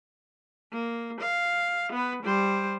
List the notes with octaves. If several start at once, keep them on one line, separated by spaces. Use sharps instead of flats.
A#3
F5
B3 B4
G3 C5